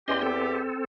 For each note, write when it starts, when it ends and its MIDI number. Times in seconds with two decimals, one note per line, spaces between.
0.08 0.61 40
0.08 0.22 61
0.08 0.61 67
0.08 0.22 75
0.08 0.22 84
0.23 0.85 60
0.23 0.85 69